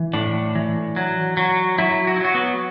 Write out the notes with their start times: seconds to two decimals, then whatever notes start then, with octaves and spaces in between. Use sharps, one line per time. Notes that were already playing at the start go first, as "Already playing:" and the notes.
Already playing: E3
0.13 A2 D4
0.55 E3
0.96 F#3
1.37 F#3
1.78 F#3 E4
2.07 F#4
2.16 E4
2.21 F#3 F#4
2.35 B3